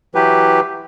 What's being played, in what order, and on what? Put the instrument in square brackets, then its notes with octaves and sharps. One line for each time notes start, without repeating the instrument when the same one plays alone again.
[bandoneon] E3 F#3 G4 B4